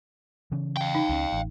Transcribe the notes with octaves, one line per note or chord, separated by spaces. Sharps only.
C#3 E3 C#4
F5 G5
D#4
C#2 C#4
A1